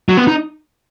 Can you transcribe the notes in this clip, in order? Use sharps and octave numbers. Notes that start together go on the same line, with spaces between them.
F#3
B3
D#4